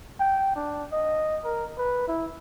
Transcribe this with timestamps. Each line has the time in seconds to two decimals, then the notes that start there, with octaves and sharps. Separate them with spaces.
0.20 G5
0.56 D4
0.92 D#5
1.44 A#4
1.78 B4
2.08 E4